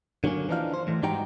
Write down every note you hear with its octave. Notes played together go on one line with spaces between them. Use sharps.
D3 F#3 A#3 C#4
E3 F3 D4 D#4 F5
C5
A2 E3
G#2 G3 D#4 F#4 G5 A#5